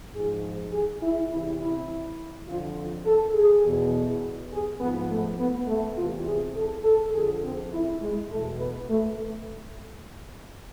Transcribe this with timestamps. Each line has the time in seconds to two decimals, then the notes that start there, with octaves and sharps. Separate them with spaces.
0.14 G#2 F3 G#4
0.73 G#4
1.02 E4
1.31 E2 C3 E3 E4
1.60 E4
2.47 F2 D3 F3 F4
3.06 A4
3.35 G#4
3.64 E2 B2
4.52 G#4
4.80 G#2 F3 B3
5.10 A3
5.39 B3
5.68 A3
5.97 E2 C3 E3 F4
6.27 G#4
6.56 A4
6.84 A4
7.14 F2 D3 F3 G#4
7.43 C4
7.73 E4
8.01 G#3
8.30 E2 B2 A3
8.59 B3
8.89 A3